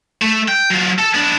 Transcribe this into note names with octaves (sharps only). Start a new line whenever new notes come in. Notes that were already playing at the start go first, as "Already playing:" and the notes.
A3
G5
F#3 F4
A4
B3 D4